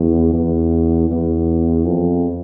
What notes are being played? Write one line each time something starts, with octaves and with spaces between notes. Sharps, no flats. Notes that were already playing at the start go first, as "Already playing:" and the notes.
Already playing: E2
E2
E2
F2